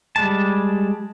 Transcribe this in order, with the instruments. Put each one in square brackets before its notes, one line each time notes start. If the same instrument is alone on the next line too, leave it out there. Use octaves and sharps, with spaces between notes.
[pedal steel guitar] G3 G#3 A5